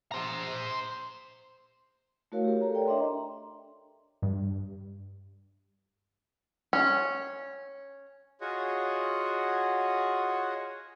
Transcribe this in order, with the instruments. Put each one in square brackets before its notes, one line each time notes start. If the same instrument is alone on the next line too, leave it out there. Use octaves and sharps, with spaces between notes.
[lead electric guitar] C5 A#5
[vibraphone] A3 E4 F#4 A#4 C#5 F5
G4 A#4
A4 C#5 A#5
D5 G5
D4 D#5 E5 A#5 C6
[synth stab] G2
[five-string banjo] C#4
[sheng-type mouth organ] F4 F#4 G#4 C#5 D#5 F#5